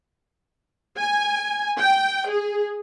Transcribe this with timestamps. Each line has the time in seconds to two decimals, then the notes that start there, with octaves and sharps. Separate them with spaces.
0.98 G#5
1.80 G5
2.28 G#4